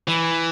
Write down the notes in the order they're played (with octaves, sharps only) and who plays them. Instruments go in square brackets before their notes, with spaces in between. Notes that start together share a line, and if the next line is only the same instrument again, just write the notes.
[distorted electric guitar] E3